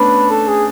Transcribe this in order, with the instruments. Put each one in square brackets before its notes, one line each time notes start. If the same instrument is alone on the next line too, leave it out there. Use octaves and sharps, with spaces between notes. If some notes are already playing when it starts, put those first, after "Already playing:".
Already playing: [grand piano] A3 B3 C#4 D4 [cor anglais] B4
[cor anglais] A4
G#4